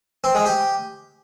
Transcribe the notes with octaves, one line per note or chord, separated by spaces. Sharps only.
C4
G#3
G4